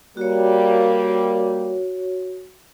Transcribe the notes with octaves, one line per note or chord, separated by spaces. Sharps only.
G3 A#3 F#4 C#5